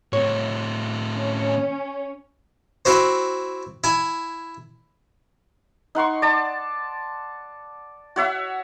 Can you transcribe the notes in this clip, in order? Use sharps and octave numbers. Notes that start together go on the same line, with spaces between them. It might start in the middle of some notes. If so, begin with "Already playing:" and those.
A2 C4 C#5
C#4
C4 E4 F#4 C5
E4 G#5
D#4 F#5 C6 C#6
D5 A5
F#4 C#5 E5 F#5